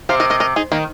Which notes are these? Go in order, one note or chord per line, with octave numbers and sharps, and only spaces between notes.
C3 C5 F5
A#4 D#5
A#4 D#5
A#4 D#5
D#4 G#4
D#3 A#3